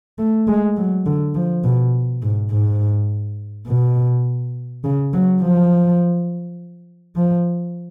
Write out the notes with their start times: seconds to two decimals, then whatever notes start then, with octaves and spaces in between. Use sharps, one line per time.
0.19 A3
0.48 G#3
0.77 F#3
1.06 D3
1.35 F3
1.64 B2
2.23 G#2
2.52 G#2
3.68 B2
4.84 C#3
5.13 F#3
5.42 F3
7.16 F3